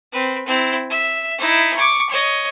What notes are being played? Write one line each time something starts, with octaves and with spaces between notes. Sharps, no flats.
C4 B4
C4 E4
E5
D#4 E4
C#6 D6
C#5 D#5